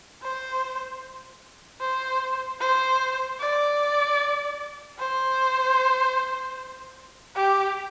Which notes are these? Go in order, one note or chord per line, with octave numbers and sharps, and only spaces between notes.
C5
C5
C5
D5
C5
G4